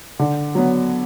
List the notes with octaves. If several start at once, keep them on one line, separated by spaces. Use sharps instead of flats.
D3
F#3 B3